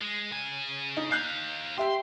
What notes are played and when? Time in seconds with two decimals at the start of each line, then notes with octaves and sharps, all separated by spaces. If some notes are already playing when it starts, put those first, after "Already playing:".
0.01 G#3
0.31 C#3 G#5
0.97 D#4
1.11 D#4 F5 F#6 G6 C7
1.78 G4 E5 G5 C6